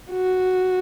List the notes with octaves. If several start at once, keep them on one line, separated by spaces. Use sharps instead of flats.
F#4